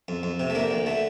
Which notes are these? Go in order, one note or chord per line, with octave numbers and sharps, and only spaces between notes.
F2
F2
C3
A3
D3 A#3
D2
D3 A3